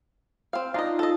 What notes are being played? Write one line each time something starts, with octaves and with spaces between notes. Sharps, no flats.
C4 F5
D4 D#4 F4 D#5
A4 D#5